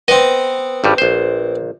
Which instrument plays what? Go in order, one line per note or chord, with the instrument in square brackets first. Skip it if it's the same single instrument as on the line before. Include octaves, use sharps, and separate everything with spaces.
[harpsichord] B3 C4 [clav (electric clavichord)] D#5
[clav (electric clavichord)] G#1 G2 G3
A#1 C5